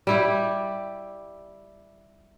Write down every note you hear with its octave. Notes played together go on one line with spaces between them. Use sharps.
G3 E4 G4